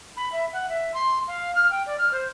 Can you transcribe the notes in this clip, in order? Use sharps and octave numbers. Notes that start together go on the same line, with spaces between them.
B5
E5
F#5
E5
C6
F5
F6
G5
D5
F6
C5